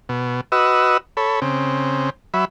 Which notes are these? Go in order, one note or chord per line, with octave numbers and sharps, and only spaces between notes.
B2
F#4 B4 D#5 E6
A4 C#5 B5
C#3 C4
F#3 E5 B5